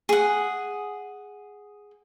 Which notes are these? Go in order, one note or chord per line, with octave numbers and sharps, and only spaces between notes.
G#4 F#5